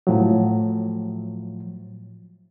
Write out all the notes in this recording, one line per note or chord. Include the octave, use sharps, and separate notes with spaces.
A2 F3 F#3